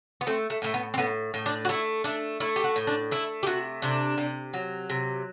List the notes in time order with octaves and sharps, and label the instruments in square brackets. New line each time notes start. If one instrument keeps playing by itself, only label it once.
[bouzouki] B3
A3 C4
A3
A2 A3
B3
C4
A2 B3
A2
D4
F#4
A3 E4
A3 D4
A3 E4
G4
F#4
A2
D4
A3 E4
G4
C3 F#4
C3 D4
C3
F#3
C3